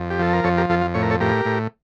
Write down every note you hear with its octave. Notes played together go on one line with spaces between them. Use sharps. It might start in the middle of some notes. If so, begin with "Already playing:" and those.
Already playing: F2
G4
F3 A4
A#4
F2 A4 C#5
G4 A#4
F2 F4 A4
F4
A2 C#5
A#4
A4 C#5
A2 G4 A#4
A2